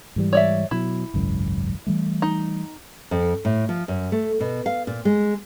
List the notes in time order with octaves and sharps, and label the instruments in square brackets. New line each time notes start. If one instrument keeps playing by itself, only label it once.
[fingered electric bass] G#2 E3 G3
[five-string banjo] C#5 D5 E5
[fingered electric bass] B2 F#3 [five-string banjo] E4
[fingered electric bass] G#1 C#2 F#2
E3 G3 A3
[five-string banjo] D#4
[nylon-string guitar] F2
A2
F3
F#2
A3
B2
F5
A#2
G#3